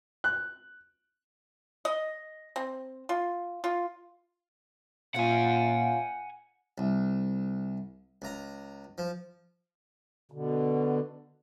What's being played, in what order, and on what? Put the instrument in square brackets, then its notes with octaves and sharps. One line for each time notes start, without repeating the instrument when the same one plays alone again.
[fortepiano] F#6
[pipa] D#5
C4
F4
F4
[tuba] A#2 [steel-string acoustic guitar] C#4 F4 [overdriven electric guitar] F#5 G#5
[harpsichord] C2
C#2 A#5
F3
[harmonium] B2 D3